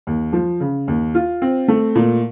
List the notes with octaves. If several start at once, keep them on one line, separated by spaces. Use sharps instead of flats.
D#2
F3
C#3
D#2
F4
C4
A3
A#2